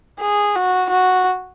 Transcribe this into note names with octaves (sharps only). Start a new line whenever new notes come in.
G#4
F#4
F#4